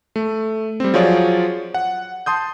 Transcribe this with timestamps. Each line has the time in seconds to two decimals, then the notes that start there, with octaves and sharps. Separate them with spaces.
0.16 A3
0.80 G3 C4
0.94 F3 F#3 F4 G#4 C#5 D5
1.74 F#5
2.26 A5 C6 D#6 G6